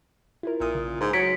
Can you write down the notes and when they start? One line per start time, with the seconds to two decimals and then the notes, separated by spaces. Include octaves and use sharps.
0.43 E4 F4 A#4
0.60 A#1 A#2 D#6
0.75 C#3
1.00 G#2
1.13 F#3 B6 C#7 D7